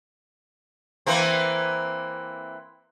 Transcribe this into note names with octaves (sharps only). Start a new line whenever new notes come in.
E3 A#3 C4